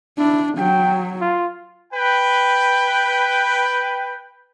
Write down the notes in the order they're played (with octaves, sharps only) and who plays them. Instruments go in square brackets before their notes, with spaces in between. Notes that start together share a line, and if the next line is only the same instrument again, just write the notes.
[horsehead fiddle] D4 [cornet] E4
[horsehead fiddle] F#3 [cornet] G5
[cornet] F4
[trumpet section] B4 G5